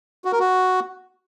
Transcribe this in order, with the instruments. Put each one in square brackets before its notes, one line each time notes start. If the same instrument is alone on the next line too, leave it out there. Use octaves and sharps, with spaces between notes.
[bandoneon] F#4
A#4
F#4